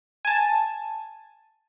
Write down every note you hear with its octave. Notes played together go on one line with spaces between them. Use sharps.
G#5 A5